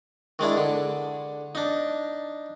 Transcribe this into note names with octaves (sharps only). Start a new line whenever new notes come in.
D#3 G#3 D4 E4
D3
D4 D#4